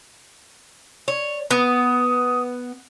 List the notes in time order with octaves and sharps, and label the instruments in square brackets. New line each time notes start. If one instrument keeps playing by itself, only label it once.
[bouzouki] C#5 [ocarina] D5
[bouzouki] B3 [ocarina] D#6